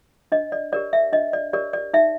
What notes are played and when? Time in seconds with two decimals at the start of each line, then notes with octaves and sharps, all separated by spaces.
0.32 D4 D#5
0.52 D5
0.72 G4 A#4 C#5 D5
0.93 E5
1.13 D4 D#5
1.33 D5
1.53 G4 A#4 C#5 D5
1.73 D5
1.94 D#4 E5